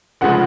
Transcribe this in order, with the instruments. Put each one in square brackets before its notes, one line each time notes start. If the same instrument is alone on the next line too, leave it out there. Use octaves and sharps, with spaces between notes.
[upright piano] F1 C#3 F3 G#3 F#5